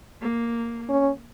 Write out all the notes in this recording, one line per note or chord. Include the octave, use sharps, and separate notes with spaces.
A#3
C#4